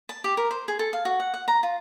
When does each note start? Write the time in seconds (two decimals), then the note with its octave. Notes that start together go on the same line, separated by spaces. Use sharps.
0.09 A5
0.24 G4
0.37 A#4
0.51 C5
0.68 G#4
0.79 A4
0.93 F5
1.05 F#4
1.20 F#5
1.34 F#5
1.48 A#5
1.63 F4